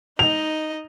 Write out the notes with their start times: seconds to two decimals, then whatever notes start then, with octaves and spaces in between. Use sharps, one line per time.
0.19 D#4 D#5 F7